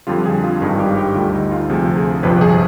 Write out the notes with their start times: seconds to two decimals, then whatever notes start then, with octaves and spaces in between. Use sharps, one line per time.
0.07 F2 D3 G3 F4
0.25 G#4
0.44 F4
0.61 G#1 G2 D#3 G3 G#4
0.79 G4
0.97 G4
1.15 D2 D3 G3 F4
1.33 D#4
1.51 F4
1.69 D2 C3 F3 G#4
1.97 G#4
2.23 G1 F2 C3 F3 B4
2.41 G#4